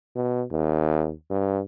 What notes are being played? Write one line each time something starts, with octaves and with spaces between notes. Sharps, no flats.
B2
D#2
G2